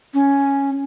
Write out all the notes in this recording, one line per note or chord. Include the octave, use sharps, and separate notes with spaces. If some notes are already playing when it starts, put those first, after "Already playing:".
C#4